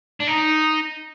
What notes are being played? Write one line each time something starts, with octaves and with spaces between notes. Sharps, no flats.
D4
D#4